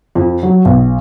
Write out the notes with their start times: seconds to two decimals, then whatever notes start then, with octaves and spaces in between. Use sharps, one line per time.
0.15 F2
0.43 F#3
0.65 B1